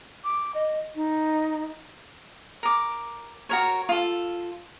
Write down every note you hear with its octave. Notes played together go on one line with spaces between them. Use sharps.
D6
D#5
D#4
A#4 D6
F#4 A#4 C#5
F4 A4